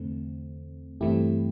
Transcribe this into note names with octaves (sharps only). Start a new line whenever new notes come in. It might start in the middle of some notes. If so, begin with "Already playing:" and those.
Already playing: E2 D3 A3 C4
G2 E3 A3 C4 E4 G4